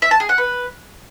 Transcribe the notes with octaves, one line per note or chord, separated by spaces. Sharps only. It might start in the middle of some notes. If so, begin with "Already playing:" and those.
E5
A5
G#4
F#5
B4